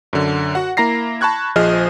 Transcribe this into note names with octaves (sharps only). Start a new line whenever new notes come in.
F#2 D3
F#4 F#5
A#3 E4 A#5 A#6 C7
A5 B5 C#6 F#6 G#6
A#1 F3 G#4 C5 D#5 F6